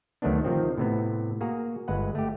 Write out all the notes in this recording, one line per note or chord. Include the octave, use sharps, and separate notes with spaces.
D2 D#3 F#3 A3 B3 D4
C3 D#3 F3 C4
A2 C3 B3
A#3 F#4 G#4 A#5
G1 G#3 B4 F#5
A3 G4